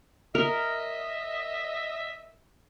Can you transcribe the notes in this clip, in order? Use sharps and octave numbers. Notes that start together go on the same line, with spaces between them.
A#4 D#5 E5